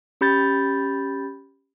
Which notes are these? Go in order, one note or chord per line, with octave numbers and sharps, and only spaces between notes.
C#4 G4 B5 G6 A6